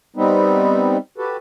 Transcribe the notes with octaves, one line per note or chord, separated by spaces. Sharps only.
G3 B3 C4 D#4
F#4 G4 A4 B4